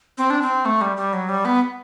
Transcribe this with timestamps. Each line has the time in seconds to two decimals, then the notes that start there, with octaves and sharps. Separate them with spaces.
0.17 C4
0.30 D4
0.42 C4
0.65 A3
0.81 G3
0.97 G3
1.13 F#3
1.29 G3
1.45 B3